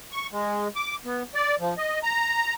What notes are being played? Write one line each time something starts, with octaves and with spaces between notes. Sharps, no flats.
C#6
G#3
D6
B3
D5
F3
D#5
A#5